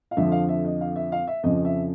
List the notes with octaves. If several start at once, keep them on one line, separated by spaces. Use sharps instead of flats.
F5
F2 D3 F3 E5
F5
E5
D#5
F5
E5
F5
E5
F2 C#3 F3 D#5
E5